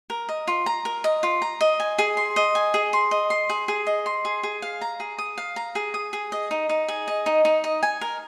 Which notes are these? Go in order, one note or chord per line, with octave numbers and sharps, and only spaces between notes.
A#4
D#5
F4
A#5
A#4
D#5
F4
A#5
D#5
G#5
G#4
C6
D#5
G#5
G#4
C6
D#5
C6
G#4
G#4
D#5
C6
G#4
G#4
F5
A#5
G#4
D#6
F5
A#5
G#4
D#6
G#4
D#5
D#4
D#4
G#4
D#5
D#4
D#4
D#5
G#5
A#4